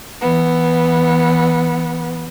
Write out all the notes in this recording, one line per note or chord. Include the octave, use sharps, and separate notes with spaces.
E3 B3